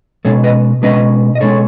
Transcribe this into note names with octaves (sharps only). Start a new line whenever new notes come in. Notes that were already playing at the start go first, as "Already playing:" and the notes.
B2 G#3 C#4 A4 C#5
B4 D#5
B2 G#3 C#4 B4 D#5
D#5
B2 G#3 C#4 A4 C#5